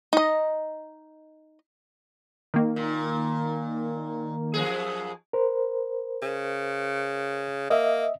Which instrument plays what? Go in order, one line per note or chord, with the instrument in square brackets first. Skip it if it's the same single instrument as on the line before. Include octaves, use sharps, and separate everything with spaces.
[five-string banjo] D#4 D#5
[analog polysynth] D#3 A#3
[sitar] A#2
F#2 F3 G#4
[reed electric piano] A#4 C5
[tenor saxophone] C#3
[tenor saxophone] A#3 [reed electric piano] D#5 E5